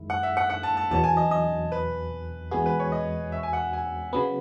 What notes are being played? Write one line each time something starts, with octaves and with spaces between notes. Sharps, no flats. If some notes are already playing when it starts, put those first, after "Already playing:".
Already playing: F#2 D#3 G#3 E4
F#5
E5
F#5
F#5
A5
A5
E2 B2 F#3 A5
G#5
D#5
D#5
B4
E2 B2 G#3 B3 F#4 G#4
B4
C#5
D#5
E5
G#5
F#5
G#5
C#3 F#3 B3 B5